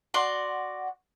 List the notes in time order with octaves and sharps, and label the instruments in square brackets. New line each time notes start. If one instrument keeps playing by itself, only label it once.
[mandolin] F#4 D5 C6